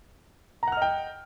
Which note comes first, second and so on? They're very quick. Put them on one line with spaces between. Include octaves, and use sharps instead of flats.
A#5 F#5 F6 D#5 G5